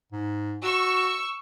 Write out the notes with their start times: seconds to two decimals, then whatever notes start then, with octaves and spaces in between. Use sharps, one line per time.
0.12 G#2
0.63 F#4 C#6 E6